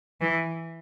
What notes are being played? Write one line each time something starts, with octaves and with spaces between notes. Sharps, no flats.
E3